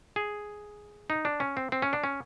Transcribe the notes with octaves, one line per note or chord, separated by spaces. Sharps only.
G#4
D#4
D4
C#4
C4
C4
C#4
D4
C#4